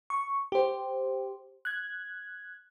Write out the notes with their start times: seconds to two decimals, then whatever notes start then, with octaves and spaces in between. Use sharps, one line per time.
0.10 C#6
0.52 G4 C5
1.65 F#6 G#6